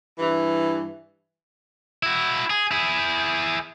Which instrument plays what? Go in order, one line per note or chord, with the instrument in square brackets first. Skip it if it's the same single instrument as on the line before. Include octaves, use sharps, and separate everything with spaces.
[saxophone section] G2 E3
[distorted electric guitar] E4 F#4
G#4
E4 G#4